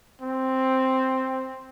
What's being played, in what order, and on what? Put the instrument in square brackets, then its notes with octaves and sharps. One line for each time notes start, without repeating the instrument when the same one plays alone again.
[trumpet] C4